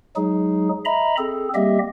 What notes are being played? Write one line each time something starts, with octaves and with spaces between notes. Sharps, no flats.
F#3 G#3 D#4 G#4
D#5 E5 A#5 B5
C4 G#4 A4
G3 A#3 C4 G4 D#5 E5